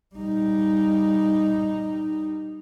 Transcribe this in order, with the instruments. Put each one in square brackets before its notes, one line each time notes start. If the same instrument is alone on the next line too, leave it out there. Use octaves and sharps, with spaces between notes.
[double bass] G3 D#4